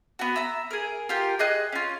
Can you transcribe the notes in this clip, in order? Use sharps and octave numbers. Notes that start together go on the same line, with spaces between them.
B3 F#4
E5 A#5
G#4 A#4
F4 G4 A#4
G#4 D#5 F#6
C#4 F4